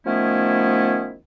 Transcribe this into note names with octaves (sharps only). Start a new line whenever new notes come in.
D#3 F3 A3 B3 C#4 E4